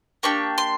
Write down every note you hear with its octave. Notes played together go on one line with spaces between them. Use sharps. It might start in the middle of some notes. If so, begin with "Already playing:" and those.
A#3 D4 G4 C#6
C6